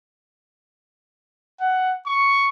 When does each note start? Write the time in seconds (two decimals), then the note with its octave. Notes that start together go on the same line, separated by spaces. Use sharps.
1.60 F#5
2.06 C#6